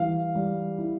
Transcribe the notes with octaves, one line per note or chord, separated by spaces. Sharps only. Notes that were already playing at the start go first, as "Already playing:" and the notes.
Already playing: E3 G3 F5
G3
E4